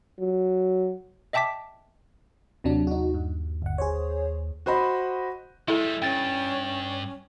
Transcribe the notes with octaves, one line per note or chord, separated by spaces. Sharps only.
F#3
D#5 E5 G5 A5 D6 B6
D#2 C3 F#3 D4
D#4 F#4
G2
G1 F#5
G#4 C5 C#5
F#4 C5 D#5 B5
G3 G#3 E4 A4 E5
G2 C#4 G5 A6